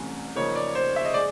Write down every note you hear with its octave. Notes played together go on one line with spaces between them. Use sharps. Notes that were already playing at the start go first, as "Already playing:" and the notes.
Already playing: C2 C3 E3 A3 C#4
C#3 F3 A#3 D#4 C#5
D5
C5
E5
D#5
G#3 D5